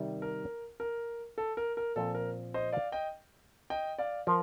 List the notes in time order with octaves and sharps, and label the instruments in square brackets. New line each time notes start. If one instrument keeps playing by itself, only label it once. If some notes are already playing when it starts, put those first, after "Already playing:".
Already playing: [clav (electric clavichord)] C3 D#3 G3
[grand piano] A#4
A#4
A4
A#4
A#4
[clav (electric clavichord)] A#2 F3 C4 [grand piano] A4
[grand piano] A#4
C5 D#5
D5 F5
D#5 G5
D#5 G5
D5 F5
[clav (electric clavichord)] F3 [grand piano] A#4